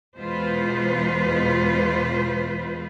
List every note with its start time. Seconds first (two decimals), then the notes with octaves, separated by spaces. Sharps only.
0.18 E2 B2 G#3 F4 B4 C5